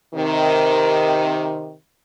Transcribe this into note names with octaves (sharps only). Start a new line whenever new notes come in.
C3 D#3